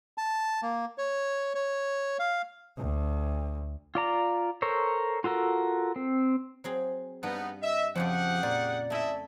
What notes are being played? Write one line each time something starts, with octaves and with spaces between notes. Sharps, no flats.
A5
A#3
C#5
C#5
F5
D2
F4 D5 A#5
A4 A#4 C5 C#5
F4 F#4 A4 A#4
C4
F#3 C4 G#4
G2 G3 B3 D#4
D#5 E5
F2 C#3 F3 F4 G4 G#4 F#5
A#2 D5
A3 E4 D#5 E5 G#5